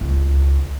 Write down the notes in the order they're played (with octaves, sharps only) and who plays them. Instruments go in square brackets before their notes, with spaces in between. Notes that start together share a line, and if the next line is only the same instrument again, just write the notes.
[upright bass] C#2